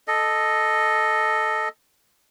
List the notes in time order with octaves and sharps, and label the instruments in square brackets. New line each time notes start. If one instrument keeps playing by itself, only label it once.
[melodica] A4 D#5